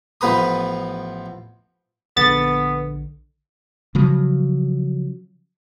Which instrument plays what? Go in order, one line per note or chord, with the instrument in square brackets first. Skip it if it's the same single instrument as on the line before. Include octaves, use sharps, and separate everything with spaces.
[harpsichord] A1 F3 B3 B4 A#5 D#6
[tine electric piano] A#1 D3 [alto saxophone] B3 [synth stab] A6
[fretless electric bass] C#3 F3 F#3